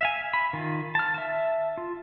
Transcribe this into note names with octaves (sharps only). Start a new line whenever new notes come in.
E5 F5 G#5
B5
D#3 F4
A5 F6
E5 A5
F4